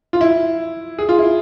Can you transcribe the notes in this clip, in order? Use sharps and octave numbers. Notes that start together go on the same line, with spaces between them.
F4
E4
G#4
F4
E4